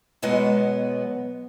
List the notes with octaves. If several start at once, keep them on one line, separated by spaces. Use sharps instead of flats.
B2 F#3 G#3 B3 F#5